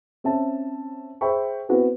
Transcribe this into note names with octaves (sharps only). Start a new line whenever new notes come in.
C4 C#4 E5 A5
G#4 C5 E5 G5 B5 C#6
B3 C4 E4 F#4 B4